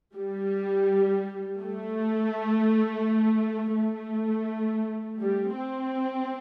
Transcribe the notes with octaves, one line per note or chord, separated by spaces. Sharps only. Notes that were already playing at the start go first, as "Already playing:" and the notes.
G3
A3
A3
G3
C4